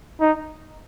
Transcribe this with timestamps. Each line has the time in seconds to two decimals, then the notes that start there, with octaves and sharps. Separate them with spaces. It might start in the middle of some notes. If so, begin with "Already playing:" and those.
0.20 D#4